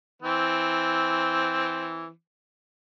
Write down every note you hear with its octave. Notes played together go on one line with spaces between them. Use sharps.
E3 C4